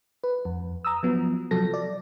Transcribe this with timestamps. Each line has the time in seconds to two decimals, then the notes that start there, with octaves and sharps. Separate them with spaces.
0.24 B4
0.45 F2
0.85 A#5 D#6 E6
1.03 F3 F#3 B3
1.51 C3 F3 F#3 A4 A#6
1.74 D5